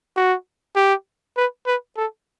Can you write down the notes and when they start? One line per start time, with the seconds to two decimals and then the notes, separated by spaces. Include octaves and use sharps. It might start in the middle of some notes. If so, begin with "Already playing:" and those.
0.17 F#4
0.76 G4
1.37 B4
1.67 B4
1.97 A4